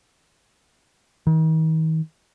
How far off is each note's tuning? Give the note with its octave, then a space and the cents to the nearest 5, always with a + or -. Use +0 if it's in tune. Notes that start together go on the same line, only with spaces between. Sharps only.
D#3 +40